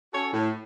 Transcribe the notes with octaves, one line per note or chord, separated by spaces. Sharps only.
C#4 F#4 A4 C#5
A2